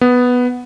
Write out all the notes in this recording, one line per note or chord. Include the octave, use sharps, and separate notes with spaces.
B3